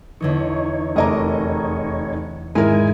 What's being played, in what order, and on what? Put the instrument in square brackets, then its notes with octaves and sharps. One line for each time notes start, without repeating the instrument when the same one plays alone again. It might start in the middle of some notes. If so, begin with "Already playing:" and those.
[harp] E2 D3 E3 [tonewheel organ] D#4 C#5
[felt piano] F1 D#5 A#5 [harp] G#4 A#4 D6
[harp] G#2 [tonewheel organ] D#3 G#5 [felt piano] G#3 E4 A#4